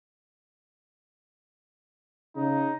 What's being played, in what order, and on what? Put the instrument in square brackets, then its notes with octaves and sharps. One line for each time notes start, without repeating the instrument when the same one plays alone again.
[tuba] C#3 [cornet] D#4